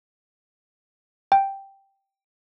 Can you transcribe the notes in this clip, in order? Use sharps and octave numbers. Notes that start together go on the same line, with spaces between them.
G5